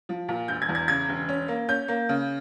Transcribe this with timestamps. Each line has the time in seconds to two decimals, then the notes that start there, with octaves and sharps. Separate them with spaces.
0.09 F3
0.29 A#2
0.48 E1 G6
0.62 G#6
0.69 E2
0.75 G#6
0.88 C#3 G#6
1.09 E1
1.29 C#4
1.48 A#3
1.68 C#4 G6
1.88 A#3
2.09 C#3